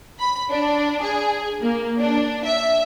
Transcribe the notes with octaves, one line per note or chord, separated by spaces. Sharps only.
B5
D4
G#4
A#3
D4
E5